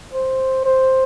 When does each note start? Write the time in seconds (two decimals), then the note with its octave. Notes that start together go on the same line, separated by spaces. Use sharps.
0.13 C5
0.65 C5